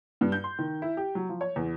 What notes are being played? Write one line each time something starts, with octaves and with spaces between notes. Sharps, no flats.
G2
G6
C6
D#3
E4
G4
F#3
F3
C#5
E2